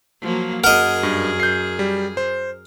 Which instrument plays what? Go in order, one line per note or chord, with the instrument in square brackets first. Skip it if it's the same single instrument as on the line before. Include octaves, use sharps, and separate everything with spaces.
[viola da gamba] F3 F#3 A#3
[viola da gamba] F#2 G#4 [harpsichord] A#4 D#5 [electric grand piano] F#5
[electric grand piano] G2
G6 C7
G3
C5